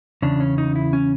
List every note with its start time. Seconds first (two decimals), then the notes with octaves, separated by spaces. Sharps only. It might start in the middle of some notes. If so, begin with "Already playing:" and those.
0.22 E2 C#3 D4
0.40 C#4
0.58 D#4
0.76 E4
0.93 C#4